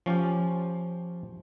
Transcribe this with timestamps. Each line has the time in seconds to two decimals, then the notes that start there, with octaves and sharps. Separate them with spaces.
0.06 F3 C#4 F4 G4